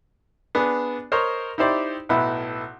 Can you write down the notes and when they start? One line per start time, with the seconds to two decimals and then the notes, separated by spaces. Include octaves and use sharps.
0.55 B3 D4 G#4
1.12 A#4 C5 C#5 D#5
1.58 D#4 E4 G4 C5 D5
2.09 B1 A2 B3 E4